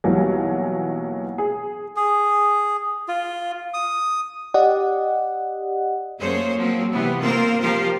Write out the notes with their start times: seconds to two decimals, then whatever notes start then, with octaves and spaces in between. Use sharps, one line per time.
0.04 B1 B2 E3 F#3 G3 A#3
1.38 G#4
1.96 G#4
3.08 F4
3.74 D#6
4.54 G4 D5 D#5 F#5
6.20 F#2 A3 A#3 G#4 C5 C#5
6.57 F3 F#3 A#3 C4
6.91 C3 E3 B3
7.20 A#3 C4 F4 A#4 C5
7.60 F3 F4 G4 A#4 C5 F5